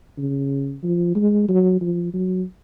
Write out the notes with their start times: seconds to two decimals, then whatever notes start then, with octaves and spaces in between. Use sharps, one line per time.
0.18 C#3
0.83 F3
1.15 G#3
1.48 F#3
1.81 F3
2.14 F#3